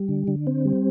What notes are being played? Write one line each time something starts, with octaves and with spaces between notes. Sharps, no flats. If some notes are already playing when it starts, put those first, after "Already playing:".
Already playing: G3
D3
D3
C4
G3